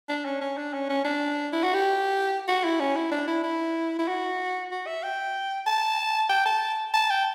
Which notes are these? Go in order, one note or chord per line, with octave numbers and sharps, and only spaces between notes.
D4
C#4
C#4
D4
C#4
C#4
D4
E4
F#4
G4
F#4
E4
C#4
E4
D4
E4
E4
E4
F#4
F#4
E5
G5
A5
G5
A5
A5
G5